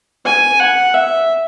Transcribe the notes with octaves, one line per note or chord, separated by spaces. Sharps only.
G#5
F#5
E5